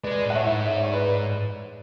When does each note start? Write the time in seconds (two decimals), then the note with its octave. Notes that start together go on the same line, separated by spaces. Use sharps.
0.04 G#3 B4 D5
0.25 A2
0.30 F#5
0.35 C#5 E5
0.46 G#2
0.66 E5
0.75 D5
0.84 C#5
0.93 B4 D5